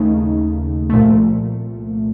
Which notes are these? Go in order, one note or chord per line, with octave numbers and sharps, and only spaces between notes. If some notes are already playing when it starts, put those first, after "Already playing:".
Already playing: D#2 C#3 A3 D#4
C2 A#2 F3 A3